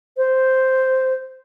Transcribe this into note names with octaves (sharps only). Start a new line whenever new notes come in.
C5